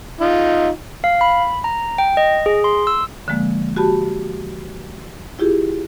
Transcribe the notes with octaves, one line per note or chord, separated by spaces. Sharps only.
D#4 F4
F5
B5
A#5
G5
D#5
G#4
C6
E6
D3 F3 G#3 A#3
F#4 G4 A5 B5
E4 F4 G4 G#4